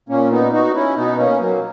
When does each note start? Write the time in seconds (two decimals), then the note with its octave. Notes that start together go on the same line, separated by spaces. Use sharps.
0.09 A#2 A#3 C#4
0.31 B3 D#4
0.52 D#4 F#4
0.75 C#4 E4
0.96 B2 B3 D#4
1.19 A#3 C#4
1.40 F#3 A#3